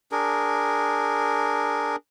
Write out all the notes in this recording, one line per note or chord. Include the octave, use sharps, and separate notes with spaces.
D4 G#4 A#4